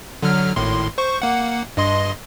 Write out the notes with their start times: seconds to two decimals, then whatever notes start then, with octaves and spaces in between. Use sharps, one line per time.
0.22 D3 F#3 F6
0.56 G#1 A2 C6
0.98 C5 C#6
1.22 A#3 F#5
1.77 G2 D#5 C6